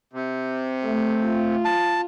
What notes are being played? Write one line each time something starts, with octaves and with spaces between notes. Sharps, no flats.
C3
A3
F4
A5